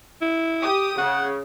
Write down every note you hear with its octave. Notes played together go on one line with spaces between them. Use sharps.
E4
G4 D#6
C#3 F#5